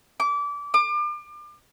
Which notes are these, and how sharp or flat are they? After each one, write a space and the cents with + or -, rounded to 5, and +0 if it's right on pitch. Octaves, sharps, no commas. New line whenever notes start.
D6 -25
D6 +35